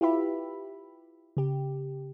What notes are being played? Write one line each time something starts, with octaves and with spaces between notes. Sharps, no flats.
E4 F4 G4 B4 E5 B5
C#3 G4